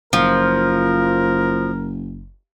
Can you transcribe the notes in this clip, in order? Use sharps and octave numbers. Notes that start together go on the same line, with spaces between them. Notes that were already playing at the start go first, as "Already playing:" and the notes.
F#1 F3 A#4